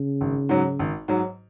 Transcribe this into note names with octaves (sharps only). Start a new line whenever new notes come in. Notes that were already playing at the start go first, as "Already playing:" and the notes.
Already playing: C#3
G#1
G#2 F#3
G#1
G#2 F#3